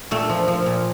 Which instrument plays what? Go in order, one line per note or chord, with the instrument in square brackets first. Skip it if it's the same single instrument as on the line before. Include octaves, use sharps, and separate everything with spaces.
[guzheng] A#2 A3
F3
F3
A#2